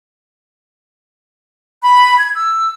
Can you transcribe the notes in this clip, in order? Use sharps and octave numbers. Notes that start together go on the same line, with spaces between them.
B5
G#6
E6